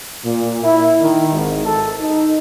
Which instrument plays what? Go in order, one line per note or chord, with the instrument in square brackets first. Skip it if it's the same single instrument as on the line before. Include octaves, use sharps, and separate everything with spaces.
[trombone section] A#2
E4
D#3
G#1
A4
D#4